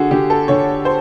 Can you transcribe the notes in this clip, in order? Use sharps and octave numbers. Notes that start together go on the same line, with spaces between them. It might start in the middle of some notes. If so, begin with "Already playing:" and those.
Already playing: D3 F#4 G#4
D3 G4
A4
D3 C#5
C5